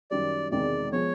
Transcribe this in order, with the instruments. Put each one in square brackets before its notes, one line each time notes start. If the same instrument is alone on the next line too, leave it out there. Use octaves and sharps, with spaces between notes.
[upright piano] F#2 D#3 G3 [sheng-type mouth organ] D5
[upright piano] E1 E2 C3 D#3 G#3 [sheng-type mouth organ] D5
[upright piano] F3 G#3 B3 [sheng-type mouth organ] C#5